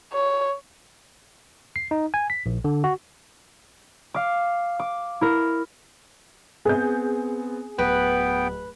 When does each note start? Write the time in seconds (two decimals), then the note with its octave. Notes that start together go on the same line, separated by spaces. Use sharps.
0.12 C#5
1.76 C7
1.91 D#4
2.14 G#5
2.30 B6
2.46 A#1
2.64 D3
2.84 F#4
4.14 F5 D6
4.79 D6
5.21 E4 A#4
6.65 B3 C4 G#4 G6
7.79 D1 B3 B4 G5